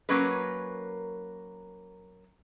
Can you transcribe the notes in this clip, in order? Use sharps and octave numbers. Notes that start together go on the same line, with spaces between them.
F#3 A#3 C#4 A#4 B4